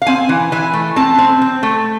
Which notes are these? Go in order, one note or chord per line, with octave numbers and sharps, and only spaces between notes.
F5
C4 G#5
E3
E3 G#5
A3
C4 A5
C4
C4
A3